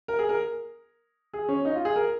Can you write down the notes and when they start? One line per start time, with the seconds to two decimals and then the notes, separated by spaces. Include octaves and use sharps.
0.08 A#4
0.19 G#4
0.29 A#4
1.33 G#4
1.49 C#4
1.65 D#4
1.75 F4
1.85 G#4
1.96 A#4